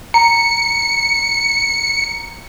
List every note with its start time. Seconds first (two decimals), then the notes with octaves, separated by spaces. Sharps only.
0.14 A#5 C#7